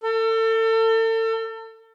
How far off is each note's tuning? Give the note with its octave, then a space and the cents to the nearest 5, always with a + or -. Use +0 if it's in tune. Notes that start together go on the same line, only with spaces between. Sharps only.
A4 +35